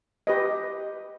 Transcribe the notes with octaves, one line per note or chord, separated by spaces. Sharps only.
G4 B4 D#5